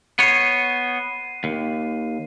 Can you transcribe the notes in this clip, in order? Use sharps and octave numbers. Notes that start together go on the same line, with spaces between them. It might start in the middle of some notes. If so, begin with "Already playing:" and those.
B3 C#5 C7 D#7
D#2